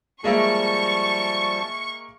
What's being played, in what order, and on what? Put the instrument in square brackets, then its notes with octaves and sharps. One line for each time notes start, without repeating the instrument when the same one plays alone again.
[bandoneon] F3 G3 A5 [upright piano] G#3 A#3 E5 [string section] C#6